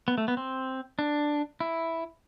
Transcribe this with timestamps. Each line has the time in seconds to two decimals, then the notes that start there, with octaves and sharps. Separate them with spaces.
0.08 B3
0.18 A3
0.28 B3
0.37 C4
0.99 D4
1.60 E4